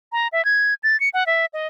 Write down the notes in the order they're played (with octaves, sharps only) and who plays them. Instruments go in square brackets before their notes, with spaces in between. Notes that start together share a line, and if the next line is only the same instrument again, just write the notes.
[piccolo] A#5
E5
G#6
A6
C#7
F#5
E5
D#5